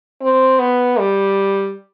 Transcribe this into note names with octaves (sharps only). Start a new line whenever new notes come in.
C4
B3
G3